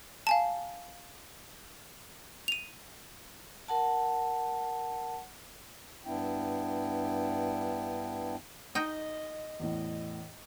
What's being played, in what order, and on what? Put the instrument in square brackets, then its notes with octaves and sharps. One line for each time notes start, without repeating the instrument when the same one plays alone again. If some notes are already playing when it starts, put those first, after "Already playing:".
[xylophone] F5 G#5 A5
D#7 F7
[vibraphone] A#4 F#5 A5
[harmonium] G2 B3 D4 E4 G5
[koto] D#4 G5 [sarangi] D#5
[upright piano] E2 A2 [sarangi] D#5